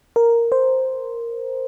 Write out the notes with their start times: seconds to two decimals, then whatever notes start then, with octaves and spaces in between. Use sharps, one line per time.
0.16 A#4
0.52 C5